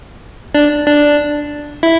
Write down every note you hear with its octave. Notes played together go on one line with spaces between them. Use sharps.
D4 D5
D4 D5
E4 E5